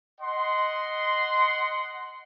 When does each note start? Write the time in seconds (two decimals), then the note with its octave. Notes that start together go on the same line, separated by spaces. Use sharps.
0.20 D#5 F#5 C6